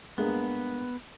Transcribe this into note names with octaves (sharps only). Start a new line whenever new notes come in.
G2 G#3 A#3 B3